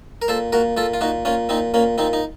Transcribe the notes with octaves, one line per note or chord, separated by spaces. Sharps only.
A#4
A#2 A4 C5
A#2 F#4 A#4
A#2 F4 A4
F4
A#2 D#4 F#4
A#2 C#4 F4
A#2 C4 D#4
A#2 A#3 C#4
A#2 C4 D#4
D#4